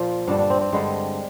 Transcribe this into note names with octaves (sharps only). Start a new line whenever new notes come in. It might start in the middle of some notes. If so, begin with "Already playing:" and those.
Already playing: A#2 F3
G2 D3 G3 D4
D4
C4
C4
G2 D3 G3 G#3